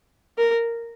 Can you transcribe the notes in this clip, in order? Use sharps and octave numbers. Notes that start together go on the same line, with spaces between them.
A#4